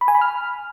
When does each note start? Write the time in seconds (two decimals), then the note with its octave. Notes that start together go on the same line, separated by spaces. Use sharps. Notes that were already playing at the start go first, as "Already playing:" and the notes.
0.01 B5
0.08 G#5
0.15 B5
0.21 F6